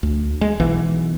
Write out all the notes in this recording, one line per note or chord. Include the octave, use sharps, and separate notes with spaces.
D2
G#3
B1 E3 B3